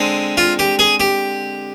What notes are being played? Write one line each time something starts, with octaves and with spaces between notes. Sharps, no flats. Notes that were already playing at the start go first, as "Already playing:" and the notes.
Already playing: D3 G#3 C4
F4
G4
G#4
G4